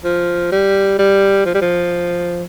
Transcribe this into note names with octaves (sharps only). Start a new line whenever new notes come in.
F3
G3
G3
F3
G3
F3